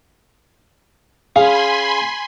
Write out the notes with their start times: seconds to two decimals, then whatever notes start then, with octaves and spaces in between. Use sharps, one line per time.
1.36 C#4 G#4 F5 G#5 B5 C6